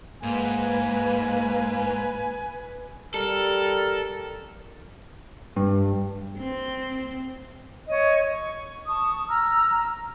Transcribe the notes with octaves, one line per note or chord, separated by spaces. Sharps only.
G#2 A#3 B4 G#5
G3 A4 A#4
G2
C4
C#5 D#5
C#6
A5 C#6 D#6
A#5 E6 F6